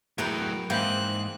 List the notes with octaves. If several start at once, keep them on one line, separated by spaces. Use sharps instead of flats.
E2 A2 F#3 A#4 B4 G5
G#2 E3 A#3 C4 G5 F#6